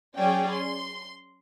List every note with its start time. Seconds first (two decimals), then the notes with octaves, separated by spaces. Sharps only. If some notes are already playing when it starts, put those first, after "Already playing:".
0.17 F#3 C#4 G#4 D5 G5
0.51 C6